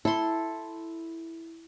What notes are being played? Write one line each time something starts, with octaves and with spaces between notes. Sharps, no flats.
E4 A4 C6